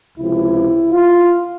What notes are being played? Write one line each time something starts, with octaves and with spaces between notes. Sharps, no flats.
C#2 C3 F3 E4
F4